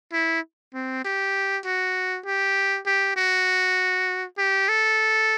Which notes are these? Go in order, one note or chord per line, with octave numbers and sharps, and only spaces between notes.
E4
C4
G4
F#4
G4
G4
F#4
G4
A4